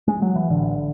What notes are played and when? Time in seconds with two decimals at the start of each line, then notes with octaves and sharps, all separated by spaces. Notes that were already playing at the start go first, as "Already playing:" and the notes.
0.08 G#3
0.22 F#3
0.36 E3
0.50 A1 D3